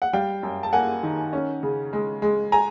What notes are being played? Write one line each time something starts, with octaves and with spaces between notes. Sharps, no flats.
F#5
G3 F5 G5
F#2
A5
A#3 F#5 G#5
D#3
C#4
C#3
G#3
G#3
G#5 A#5